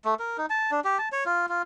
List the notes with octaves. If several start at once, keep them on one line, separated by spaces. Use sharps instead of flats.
A3
A#4
D#4
A5
D4
G4
A5
C#5
F4
F4